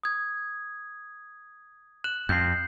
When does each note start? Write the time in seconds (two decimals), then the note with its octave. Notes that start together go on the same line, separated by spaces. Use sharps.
0.03 D#6 G#6
2.04 F#6 E7 F#7
2.29 F2 G6 C7